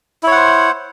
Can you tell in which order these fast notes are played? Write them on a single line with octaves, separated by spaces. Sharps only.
E4 C#5 F#5 C5